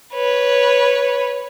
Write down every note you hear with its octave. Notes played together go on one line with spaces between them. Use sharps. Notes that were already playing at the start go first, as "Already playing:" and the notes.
B4 C#5